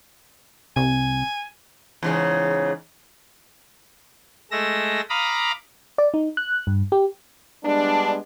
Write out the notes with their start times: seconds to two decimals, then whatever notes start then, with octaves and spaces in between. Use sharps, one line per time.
0.76 C2 G#5
2.03 E2 G#2 C#3
4.51 G#3 A3 E6 A#6
5.09 F5 A#5 B5 D6 D#6
5.98 D5
6.14 D#4
6.37 F#6
6.67 G2
6.92 G4
7.65 G3 G#3 B3 D4